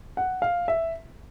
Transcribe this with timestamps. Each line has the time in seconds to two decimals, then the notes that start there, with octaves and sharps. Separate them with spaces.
0.17 F#5
0.42 F5
0.68 E5